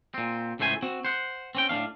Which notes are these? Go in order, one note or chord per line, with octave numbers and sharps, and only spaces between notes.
A#2 C4
C#2 A2 A3 C5 G#5
C4 F#4
C5 F#5
C4 C#4 G5
A2 C#4 D4 F5